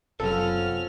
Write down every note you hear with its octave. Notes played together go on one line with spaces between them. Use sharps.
F#1 C3 F3 F#3 B3 C#4 A4 F6